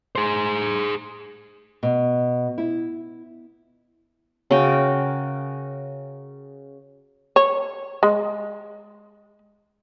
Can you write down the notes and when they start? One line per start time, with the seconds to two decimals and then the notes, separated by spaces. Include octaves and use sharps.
0.15 G#4 C5
1.83 B2
2.58 E4
4.51 C#3 F#4 A#4 G5
7.36 C#5
8.03 G#3